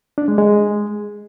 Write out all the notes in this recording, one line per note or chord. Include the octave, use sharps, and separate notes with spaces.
D4
G#3
G#3